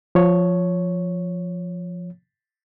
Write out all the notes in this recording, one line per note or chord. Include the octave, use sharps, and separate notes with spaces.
F3 C#5